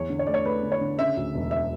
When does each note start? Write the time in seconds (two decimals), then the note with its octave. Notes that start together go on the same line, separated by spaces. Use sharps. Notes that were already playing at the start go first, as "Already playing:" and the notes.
Already playing: E2 C#5
0.10 D3
0.19 C#5
0.27 A3 D5
0.34 C#5
0.45 A3 B4
0.63 D3
0.72 C#5
0.81 D3
0.99 C#3 E5
1.17 D2
1.34 E1
1.51 E5